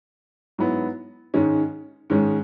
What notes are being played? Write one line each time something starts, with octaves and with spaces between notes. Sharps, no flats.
G#2 F#3 B3 E4
G#2 D#3 G#3 C#4
G#2 D#3 G#3 C#4